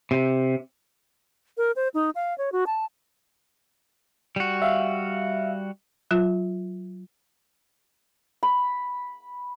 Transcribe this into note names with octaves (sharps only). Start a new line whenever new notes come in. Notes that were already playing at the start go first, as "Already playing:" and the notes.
C3
A#4
C5
D#4
F5
C#5
F#4
A5
G3 F#4
E5 F5
F#3 F4
B5